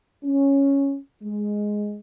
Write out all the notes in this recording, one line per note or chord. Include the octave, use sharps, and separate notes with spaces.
C#4
G#3